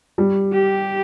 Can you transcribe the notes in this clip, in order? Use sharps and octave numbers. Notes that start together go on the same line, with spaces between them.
G3
G4